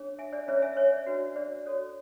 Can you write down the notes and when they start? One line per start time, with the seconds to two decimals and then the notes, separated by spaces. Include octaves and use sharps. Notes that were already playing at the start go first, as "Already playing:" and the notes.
Already playing: D4 G#4 C#5
0.19 E5 G#5
0.33 D5
0.47 C#4 E4 G#4 B4 C#5 E5
0.62 E5 G#5
0.77 C#5 E5
0.92 D5
1.06 D4 F#4 B4
1.36 D5
1.66 F#4 A4 C#5